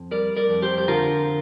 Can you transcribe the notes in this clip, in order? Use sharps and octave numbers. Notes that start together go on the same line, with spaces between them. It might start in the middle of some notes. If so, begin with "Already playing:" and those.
Already playing: F2
G3 A#4 D5
A#4 D5
F2
G4 C5
C5
D3 F4 A#4